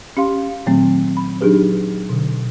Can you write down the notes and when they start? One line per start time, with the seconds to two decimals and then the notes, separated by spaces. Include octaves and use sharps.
0.17 C#4 G4 F5 C6
0.66 A#2 D#3 F#3 A3 C4
1.17 B5
1.41 F#3 D4 D#4 G4 G#4 B4
2.09 B2 D3